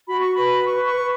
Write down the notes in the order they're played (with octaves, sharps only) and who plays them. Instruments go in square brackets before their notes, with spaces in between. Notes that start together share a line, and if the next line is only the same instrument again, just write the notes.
[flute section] F#4 B5
C#6
B4 B5
B4 C#6
C#6
B4